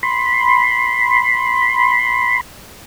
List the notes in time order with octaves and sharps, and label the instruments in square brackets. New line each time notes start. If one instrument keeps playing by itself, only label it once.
[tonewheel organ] B5 C6